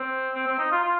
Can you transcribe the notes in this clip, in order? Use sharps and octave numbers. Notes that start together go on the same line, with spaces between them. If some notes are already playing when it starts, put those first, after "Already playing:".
Already playing: C4
C4
C4
D#4
F4
F4